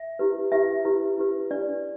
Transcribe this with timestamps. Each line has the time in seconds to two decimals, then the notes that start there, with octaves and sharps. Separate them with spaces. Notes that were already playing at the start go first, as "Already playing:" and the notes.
Already playing: E5
0.19 E4 G4 B4
0.52 E4 G4 B4 E5
0.85 E4 G4 B4
1.18 E4 G4 B4
1.51 D4 B4 D5